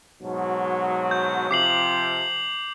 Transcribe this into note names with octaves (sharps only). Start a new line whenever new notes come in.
G#2 B2 F#3
G6
C3 F3 D6 C7 F#7